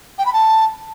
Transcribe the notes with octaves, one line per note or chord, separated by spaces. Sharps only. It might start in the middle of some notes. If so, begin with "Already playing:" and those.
G5
B5
A5